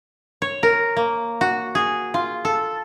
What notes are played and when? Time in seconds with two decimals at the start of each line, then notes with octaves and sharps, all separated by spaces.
0.42 C#5
0.63 A#4
0.97 A#3
1.41 F#4
1.75 G#4
2.14 F4
2.45 A4